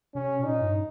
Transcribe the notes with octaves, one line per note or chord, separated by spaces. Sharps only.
C3 C#4
A#2
D#4
G2